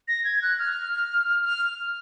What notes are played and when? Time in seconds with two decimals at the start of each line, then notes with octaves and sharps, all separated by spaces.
0.08 A#6
0.25 G#6
0.42 F#6
0.59 F6
1.44 F6